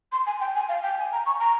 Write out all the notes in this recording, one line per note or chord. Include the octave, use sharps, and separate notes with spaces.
C6
G#5
G5
G#5
F5
G5
G#5
A#5
C#6
A#5